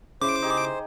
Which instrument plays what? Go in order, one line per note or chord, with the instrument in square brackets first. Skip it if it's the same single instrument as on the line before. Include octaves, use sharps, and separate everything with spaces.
[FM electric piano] C#3 E4 [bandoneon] C5 [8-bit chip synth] D6
[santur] D#4 G4 G#4